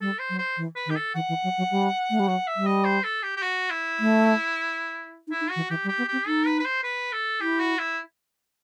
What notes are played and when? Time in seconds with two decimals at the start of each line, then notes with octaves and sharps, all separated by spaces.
0.01 G3 A4
0.19 C5
0.30 F#3
0.39 C5
0.57 E3
0.76 B4
0.86 D#3
0.90 G4
0.96 A4
1.15 E3 F#5
1.29 E3
1.44 F#3
1.58 F#3
1.71 G3
2.10 A3
2.20 G3
2.28 F#3 F#5
2.47 E5
2.56 G3
2.66 D#5
2.85 C5
3.04 A4
3.23 G4
3.37 G4
3.42 F#4
3.70 E4
4.00 A3
5.27 D#4
5.32 E4
5.41 D#4
5.50 F#4
5.56 E3
5.70 E3 G4
5.84 G3
5.88 G4
5.98 B3
6.08 C4 G4
6.26 D#4 A4
6.46 B4
6.59 B4
6.65 C5
6.83 B4
7.12 A4
7.41 E4 G4
7.60 F#4
7.79 E4